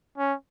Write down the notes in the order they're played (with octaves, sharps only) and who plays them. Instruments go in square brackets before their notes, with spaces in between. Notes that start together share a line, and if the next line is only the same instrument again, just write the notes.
[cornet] C#4